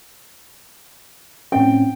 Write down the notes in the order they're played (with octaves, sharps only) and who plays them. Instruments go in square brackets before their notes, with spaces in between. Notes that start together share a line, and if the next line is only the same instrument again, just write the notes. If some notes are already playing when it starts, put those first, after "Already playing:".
[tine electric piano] A2 C4 C#4 [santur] G5